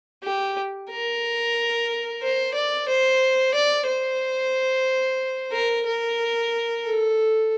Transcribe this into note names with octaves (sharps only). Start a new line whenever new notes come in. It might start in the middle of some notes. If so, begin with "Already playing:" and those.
G4
A#4
C5
D5
C5
D5
C5
A#4
A#4
A4